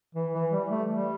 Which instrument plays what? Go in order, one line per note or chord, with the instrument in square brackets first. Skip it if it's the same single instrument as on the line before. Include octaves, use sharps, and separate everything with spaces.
[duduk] E3
E3
G3
A3
G3